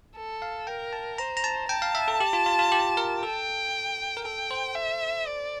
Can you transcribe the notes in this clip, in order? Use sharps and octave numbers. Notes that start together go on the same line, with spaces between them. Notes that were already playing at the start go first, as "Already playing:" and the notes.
A4
F5
A#4 G5
A5
C5 A#5
A#5
A5
G5 A5
F5
E5
A4
G4
F4
F4
F4
G4
A#4
A4 G5
A#4
A4 G5
C5
E5
D5